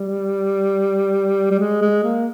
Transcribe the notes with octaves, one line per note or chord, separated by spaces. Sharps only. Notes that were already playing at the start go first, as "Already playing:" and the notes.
Already playing: G3
G3
G#3
G#3
A#3